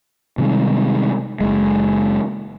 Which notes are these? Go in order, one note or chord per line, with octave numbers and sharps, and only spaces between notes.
C3 D#3 G3 G#3
F#1 G#3